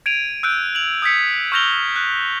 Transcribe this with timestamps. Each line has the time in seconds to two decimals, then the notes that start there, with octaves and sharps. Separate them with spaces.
0.06 G#6 D7 D#7 F7
0.43 E6 F#6 G6 D7
0.75 F7 F#7
1.02 D#6 G6 G#6 B6 C#7
1.52 C#6 F6 G6 A#6 F7 G7
1.96 F#6